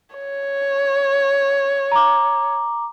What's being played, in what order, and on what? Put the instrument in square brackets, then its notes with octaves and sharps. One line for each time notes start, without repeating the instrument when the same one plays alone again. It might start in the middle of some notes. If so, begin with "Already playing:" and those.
[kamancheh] C#5
[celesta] A#5 D6